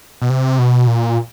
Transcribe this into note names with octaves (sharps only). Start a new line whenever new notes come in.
B2
C3
B2
A#2